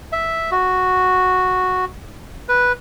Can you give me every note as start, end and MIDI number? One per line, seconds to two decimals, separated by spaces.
0.13 0.50 76
0.51 1.85 66
2.49 2.72 71